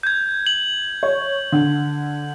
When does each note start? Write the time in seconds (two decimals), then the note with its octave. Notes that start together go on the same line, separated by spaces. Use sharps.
0.03 G6 G#6
0.46 F#7
1.03 C#5
1.52 D3